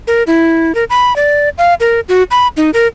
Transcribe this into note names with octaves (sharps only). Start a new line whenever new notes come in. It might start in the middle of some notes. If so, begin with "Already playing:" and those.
A#4
E4
A#4
B5
D5
F5
A#4
F#4
B5
D#4
A#4